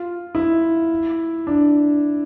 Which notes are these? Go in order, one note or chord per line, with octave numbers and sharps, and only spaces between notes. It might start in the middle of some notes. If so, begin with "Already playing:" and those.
Already playing: F4
E4
D4